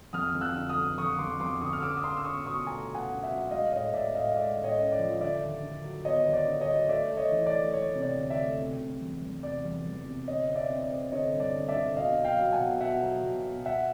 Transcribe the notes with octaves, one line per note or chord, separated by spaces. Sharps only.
F2 D#6 F6
F2
E6 F#6
D3
D#6 F6
F2
F2 C#6 D#6
F2 C6 D6
F2 C6 D6
D3 C#6 D#6
F6
C#4 D6 E6
D#6
C#4 C6 D6
E6
C#4 C#6 D#6
B2 C#6 D#6
A3 G#5 A#5
B2
F#5 G#5
C#4
E5 F#5
F#3
G#3 D#5 F5
A2 C#5 D#5
A2 D5 E5
A2 D#5 F5
G#3 D5 E5
A2
C#5 D#5
C#4
D5
F3
D3 D5 E5
D#2
D3
F#3
B3 C#5 D#5
D#2
D5
D3
C#5 D#5
F#3
A3 D5 E5
A3
C#5 D#5
E3
D5
A3
A3 C#5
C3
D5
D2
D5 E5
A3
C3
C3
E2
E2
C3 D5
E2
E2
C3
D3 C#5 D#5
C4
D5 E5
C4
D5
C4
D3 C#5 D#5
G2
D5
D3
D5 E5
D3
B2 D#5 F5
F#3
F5 G5
F#3
F#5 G#5
B2
B2 E5 F#5
F#3
B2
B2
B2 E5 F#5